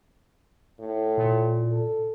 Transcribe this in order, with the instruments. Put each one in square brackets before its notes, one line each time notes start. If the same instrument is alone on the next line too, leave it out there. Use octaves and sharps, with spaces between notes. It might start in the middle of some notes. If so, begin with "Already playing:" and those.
[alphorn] A2
[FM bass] A#2
[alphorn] A4